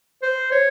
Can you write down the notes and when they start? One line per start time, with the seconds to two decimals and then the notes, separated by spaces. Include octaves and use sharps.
0.22 C5
0.52 C#5